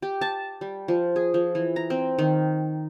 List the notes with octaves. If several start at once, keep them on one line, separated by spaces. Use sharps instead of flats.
G4
A5
G3
F3
G#4
F3
E3
A#5
C4
D#3